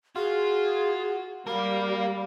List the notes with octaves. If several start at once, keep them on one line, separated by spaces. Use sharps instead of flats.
F4 F#4 G#4
G3 A#3 A#4 F5